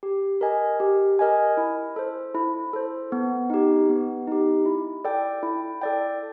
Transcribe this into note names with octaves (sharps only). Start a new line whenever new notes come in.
G4
A#4 D#5 G#5
G4
A#4 D#5 G#5
E4
A4 C5
E4
A4 C5
B3
D#4 G4
B3
D#4 G4
E4
A4 D5 G5
E4
A4 D5 G5